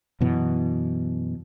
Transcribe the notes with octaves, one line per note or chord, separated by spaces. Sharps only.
F#2 B2 E3